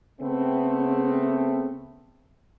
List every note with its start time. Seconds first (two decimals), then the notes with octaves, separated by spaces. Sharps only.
0.20 C#3 A3 B3 C4